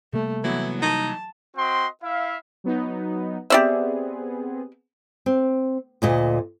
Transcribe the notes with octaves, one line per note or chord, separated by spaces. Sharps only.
C3 G3 A3 A#3
E3 F#3 B3 E4
D#4 A5
C4 F#4 D#5 G5 C6
E4 E5 F5
F#3 B3 D#4
B3 C4 G4 G#4 D5 E5
C4
D2 A#2 D#5